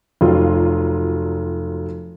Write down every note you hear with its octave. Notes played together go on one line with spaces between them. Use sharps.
F1 F#3 F4